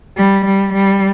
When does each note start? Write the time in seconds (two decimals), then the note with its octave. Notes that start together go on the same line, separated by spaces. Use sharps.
0.17 G3
0.45 G3
0.73 G3